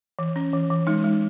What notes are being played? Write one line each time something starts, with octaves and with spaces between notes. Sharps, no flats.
E3
C#4
E3
E3
G#3 D#4
G#3